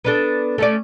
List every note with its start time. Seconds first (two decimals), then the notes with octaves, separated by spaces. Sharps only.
0.05 B3 D4 A4
0.58 A3 C#4 D5